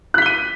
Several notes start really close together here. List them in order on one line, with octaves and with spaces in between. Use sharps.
F#6 B6 G7 D#7